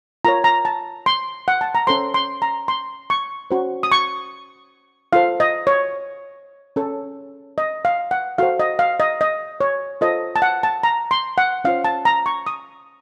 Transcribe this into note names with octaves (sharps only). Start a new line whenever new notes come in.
F4 A#4 C#5 A#5
A#5
A5
C6
F#5
A5
A#5
C#4 A4 C5 C6
C6
A#5
C6
C#6
C#4 F#4 C5
D#6
C#6
F4 A4 C5 F5
D#5
C#5
C#4 A4 C#5
D#5
F5
F#5
F#4 A4 C5 F5
D#5
F5
D#5
D#5
C#5
F4 A4 C5 D#5
A5
F#5
A5
A#5
C6
F#5
C#4 F4 C5 F5
A5
A#5
C#6
D#6